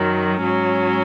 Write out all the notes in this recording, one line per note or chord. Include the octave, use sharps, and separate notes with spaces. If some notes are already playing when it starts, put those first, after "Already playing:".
Already playing: F#2 D#3 F#3
G#2 F#3 C#4